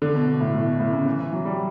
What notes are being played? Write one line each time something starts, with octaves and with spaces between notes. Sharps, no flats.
D3
B2
B2
A2
A2
B2
A2
C#3
E3
E3
F#3
G3